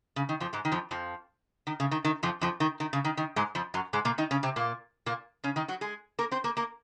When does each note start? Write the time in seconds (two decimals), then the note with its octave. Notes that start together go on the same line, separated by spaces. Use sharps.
0.16 C#3
0.29 D#3
0.40 F2 F3
0.53 G#2 G#3
0.65 D#3
0.72 F2 F3
0.91 F2 F3
1.67 D#3
1.80 C#3
1.91 D#3
2.05 D#3
2.23 F2 F3
2.41 F2 F3
2.60 D#3
2.80 D#3
2.93 C#3
3.05 D#3
3.17 D#3
3.36 G#2 G#3
3.55 F2 F3
3.74 F#2 F#3
3.93 G#2 G#3
4.05 A#2 A#3
4.18 D#3 D#4
4.31 C#3 C#4
4.43 C3 C4
4.56 A#2 A#3
5.06 A#2 A#3
5.44 C#3 C#4
5.56 D#3 D#4
5.68 F#3 F#4
5.81 G#3 G#4
6.19 A#3 A#4
6.31 C4 C5
6.44 A#3 A#4
6.57 A#3 A#4